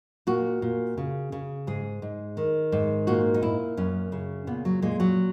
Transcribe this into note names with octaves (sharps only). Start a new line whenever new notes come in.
A#2 F#4
A#2
C#3
C#3
G#2 G#4
G#2
D#3
G#2
A#2 F#4
D#4
A#2 E4
F#2 C#4
C#3
A#2 B3
F#3
A#2 G#3
F#3